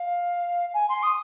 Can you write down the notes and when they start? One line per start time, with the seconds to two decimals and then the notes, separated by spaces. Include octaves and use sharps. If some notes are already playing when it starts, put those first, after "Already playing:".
Already playing: F5
0.74 G#5
0.89 C6
1.03 D#6